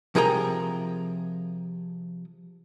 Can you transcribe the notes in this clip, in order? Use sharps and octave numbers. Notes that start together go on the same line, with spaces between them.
C3 F3 G#4 A#4 G5 A#5